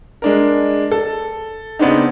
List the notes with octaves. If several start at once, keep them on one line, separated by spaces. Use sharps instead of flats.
G#3 D4 A#4
A4
C#3 B3 C4 D4 D#4